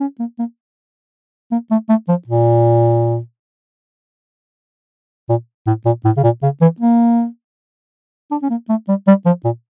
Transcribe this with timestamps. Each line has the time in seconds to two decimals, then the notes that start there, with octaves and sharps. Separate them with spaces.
0.01 C#4
0.20 A#3
0.39 A#3
1.52 A#3
1.71 A3
1.89 A3
2.09 F3
2.28 A#2
5.29 A#2
5.67 A2
5.86 A#2
6.05 A2
6.17 C#3
6.24 A#2
6.43 C#3
6.61 E3
6.80 A#3
8.31 D4
8.43 C#4
8.50 A#3
8.69 A3
8.89 G3
9.07 G3
9.26 F3
9.45 A#2